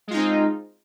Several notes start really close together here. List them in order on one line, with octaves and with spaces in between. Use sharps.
G#3 F4 D#4 C4